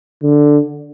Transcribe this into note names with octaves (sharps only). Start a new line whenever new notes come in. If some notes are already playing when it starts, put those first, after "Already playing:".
D3